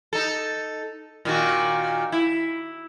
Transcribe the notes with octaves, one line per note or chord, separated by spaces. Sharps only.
D#4 A4
A#2 D#3 F#4
E4